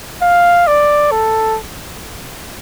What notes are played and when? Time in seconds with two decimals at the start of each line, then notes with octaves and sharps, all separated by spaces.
0.22 F5
0.67 D5
1.11 A4